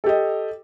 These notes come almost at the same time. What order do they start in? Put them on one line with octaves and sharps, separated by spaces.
A4 G4 D#5